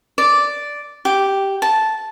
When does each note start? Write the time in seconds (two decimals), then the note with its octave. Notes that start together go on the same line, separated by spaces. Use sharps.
0.18 D5
1.05 G4
1.62 A5